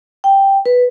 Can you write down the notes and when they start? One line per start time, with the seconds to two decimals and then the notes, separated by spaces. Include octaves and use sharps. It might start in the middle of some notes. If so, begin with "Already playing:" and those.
0.24 G5
0.66 B4